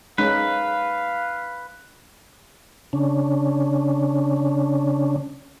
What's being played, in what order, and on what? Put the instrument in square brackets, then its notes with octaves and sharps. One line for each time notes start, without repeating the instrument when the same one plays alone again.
[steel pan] G#3 C#4 D#4 [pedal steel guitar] B4 [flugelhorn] F5
[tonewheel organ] C#3 C#4 D4